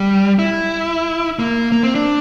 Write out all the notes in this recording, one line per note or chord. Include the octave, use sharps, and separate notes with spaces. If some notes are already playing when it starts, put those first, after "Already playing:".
Already playing: G3
E4
A#3
A#3
C4
D4